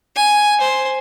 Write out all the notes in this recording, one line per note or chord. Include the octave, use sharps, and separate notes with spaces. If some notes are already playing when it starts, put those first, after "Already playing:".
G#5
C5